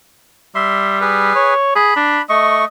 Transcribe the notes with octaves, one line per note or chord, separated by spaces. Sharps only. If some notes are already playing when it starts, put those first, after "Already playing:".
G3 E5 C6
G#4 B4
C#5
G#4 B5
D4
A3 D#5 C#6